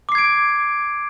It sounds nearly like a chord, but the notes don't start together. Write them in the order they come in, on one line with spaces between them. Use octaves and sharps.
D6 C7 G#6 D7